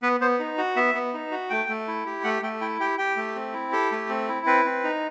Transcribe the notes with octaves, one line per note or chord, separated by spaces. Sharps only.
B3 B4
B3 C5
D#4
F#4
B3 E5
B3
D#4
F#4
A3 G5
A3
E4
G4
A3 F#5
A3 G5
E4 G5
G4 G5
G4 G5
A3
C4
E4
G4 A4
A3
C4
E4
C4 B4
C4
D#4